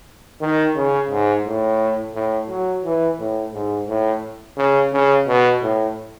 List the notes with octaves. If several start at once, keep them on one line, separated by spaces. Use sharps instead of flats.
D#3
C#3
G#2
A2
A2
F#3
E3
A2
G#2
A2
C#3
C#3
B2
A2